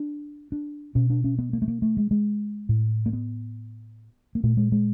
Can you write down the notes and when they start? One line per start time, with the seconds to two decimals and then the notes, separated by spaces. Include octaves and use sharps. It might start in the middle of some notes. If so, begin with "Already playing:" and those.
Already playing: D4
0.52 D4
0.95 B2 C#4
1.10 D4
1.24 C#4
1.39 B3
1.53 A#3
1.62 A3
1.68 A#3
1.82 A3
1.97 G#3
2.11 G#3
2.69 A2
3.06 A#3
3.13 B3
4.35 A#3
4.43 A#2 A3
4.57 G#3
4.72 G#3